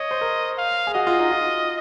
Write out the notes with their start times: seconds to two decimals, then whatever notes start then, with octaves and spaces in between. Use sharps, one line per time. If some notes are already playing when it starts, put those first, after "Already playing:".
Already playing: C#5 D#5
0.11 C5
0.21 A#4
0.58 F5
0.87 G#4
0.95 F#4 D#5
1.07 F4
1.19 D#4
1.31 F4